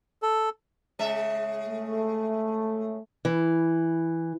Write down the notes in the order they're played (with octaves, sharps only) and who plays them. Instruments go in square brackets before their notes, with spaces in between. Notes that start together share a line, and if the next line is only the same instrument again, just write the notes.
[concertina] A4
[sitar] C#3 G#3 E5
[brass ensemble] A3
[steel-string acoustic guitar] E3